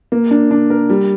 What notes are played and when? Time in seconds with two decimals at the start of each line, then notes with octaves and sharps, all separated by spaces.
0.12 A#3
0.31 D4
0.51 D4
0.70 A#4
0.90 G3